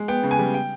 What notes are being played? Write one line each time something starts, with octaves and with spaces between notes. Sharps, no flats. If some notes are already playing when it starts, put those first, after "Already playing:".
Already playing: G#3
B3 G5
C#3
G#5
G3
G5